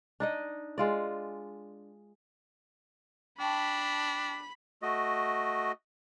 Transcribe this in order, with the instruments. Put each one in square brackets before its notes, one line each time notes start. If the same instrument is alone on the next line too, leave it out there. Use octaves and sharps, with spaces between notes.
[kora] D4 D#4 D#5
G#3 F4 D5
[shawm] D4 [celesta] G5 A5 C#6 [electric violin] B5 B6
[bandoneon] A3 F#4 D#5